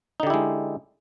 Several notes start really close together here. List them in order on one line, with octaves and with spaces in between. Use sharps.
D#4 D3 G4 E4 G#3